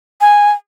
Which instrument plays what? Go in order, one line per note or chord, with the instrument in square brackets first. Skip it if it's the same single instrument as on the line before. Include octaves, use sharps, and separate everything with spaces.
[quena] G#5